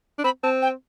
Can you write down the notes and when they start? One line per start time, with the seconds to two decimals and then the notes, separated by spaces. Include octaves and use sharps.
0.18 D4
0.24 C4 B5
0.43 C4 A5
0.62 G5